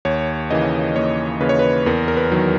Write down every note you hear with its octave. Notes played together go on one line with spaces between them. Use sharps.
D#2 C#5
C#3 E3 A#3 D#5
D#2 C#5
C#3 E3 A#3 B4
C#5
B4
E2 A#4
A#4
B4
D#3 F#3